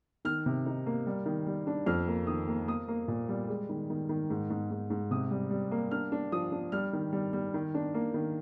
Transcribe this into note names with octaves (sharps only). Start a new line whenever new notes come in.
D#3 F6
C3
D#4
A#3
G3
D#3
G3
D4
F2 F6
A#3
D#3 D#6
A#3
A#3 D#6
A#3
A#2
G3
G#3
D#3
D#3
D#3
G#2
G#2
G#2
G#2
C3 D#6
G3
G3
A#3
D4 F6
D4
F3 D#6
D4
G3 F6
D#3
G3
G3
D#3
D4
A#3
D#3